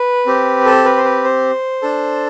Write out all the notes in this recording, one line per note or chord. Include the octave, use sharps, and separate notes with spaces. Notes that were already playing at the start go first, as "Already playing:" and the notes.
Already playing: B4
C4 G4
A4
B4
C5
B4
C5
D4 A4